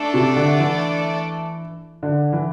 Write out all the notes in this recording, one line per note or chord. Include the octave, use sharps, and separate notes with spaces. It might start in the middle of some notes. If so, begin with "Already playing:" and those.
Already playing: A3 D4 A4 D5
C3
D3
E3
D3
E3